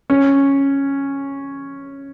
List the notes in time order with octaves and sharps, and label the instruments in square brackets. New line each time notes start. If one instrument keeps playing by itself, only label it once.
[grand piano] C#4